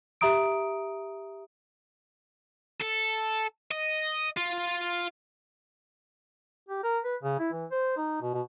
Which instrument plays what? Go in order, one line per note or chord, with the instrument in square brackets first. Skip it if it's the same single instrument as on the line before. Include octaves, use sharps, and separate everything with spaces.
[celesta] G4 E5 A#5 D#6 D7
[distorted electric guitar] A4
D#5
F4
[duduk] G4
A#4
B4
C#3
E4
E3
C5
D#4
B2
B2